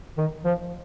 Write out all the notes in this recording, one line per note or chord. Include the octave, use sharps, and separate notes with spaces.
D#3
F3